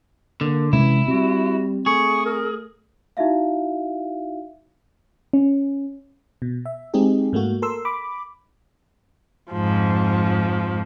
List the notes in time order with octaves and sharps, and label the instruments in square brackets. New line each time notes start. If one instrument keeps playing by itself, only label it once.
[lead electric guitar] D3 [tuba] A#3
[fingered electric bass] C3 G#3 C#4 [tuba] E3 [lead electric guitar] E4
[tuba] G3 [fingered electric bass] C4 [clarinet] F#4
[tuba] A3 [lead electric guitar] G#4 [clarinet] C#6
[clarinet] A#4
[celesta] D#4 E4 F#4 E5 F5
[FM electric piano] C#4
B2
E5
G#3 C4 D#4 G4 G#4
G#2 A3 A#3 F#4
A4 A#4 C6 E6
B5 D6
[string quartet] F2 G#2 F3